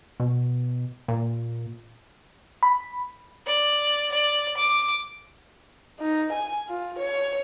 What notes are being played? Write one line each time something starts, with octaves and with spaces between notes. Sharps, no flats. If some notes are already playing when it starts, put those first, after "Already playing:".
B2
A#2
B5
D5
D5
D6
D#4
G#5
F4
C#5